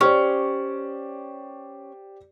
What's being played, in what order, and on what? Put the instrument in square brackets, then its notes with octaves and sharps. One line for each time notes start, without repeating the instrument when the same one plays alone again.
[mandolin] C#4 [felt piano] G4 C5 D5